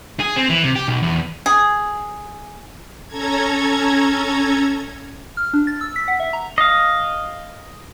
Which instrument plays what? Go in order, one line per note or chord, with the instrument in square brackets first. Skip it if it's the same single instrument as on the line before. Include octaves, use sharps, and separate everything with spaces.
[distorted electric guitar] G#4
C4
E3
C3
G4
B1
E2
[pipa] G#4
[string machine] C#4 A4 A#5 G#6
[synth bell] F6
D4
A6
E6
B6
F#5
E5
A#5
[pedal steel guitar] D#5 F5